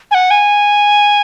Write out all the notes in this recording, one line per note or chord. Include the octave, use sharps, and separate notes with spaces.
G#5
F#5
G#5